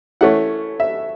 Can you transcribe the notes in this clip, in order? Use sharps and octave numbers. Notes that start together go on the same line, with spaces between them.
E3 A3 C#4 F#5
E5